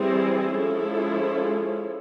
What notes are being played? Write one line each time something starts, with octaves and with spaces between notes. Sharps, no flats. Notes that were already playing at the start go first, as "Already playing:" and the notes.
Already playing: E3 G3 C4 E4 G#4
F3 G#3 C#4 E4 A4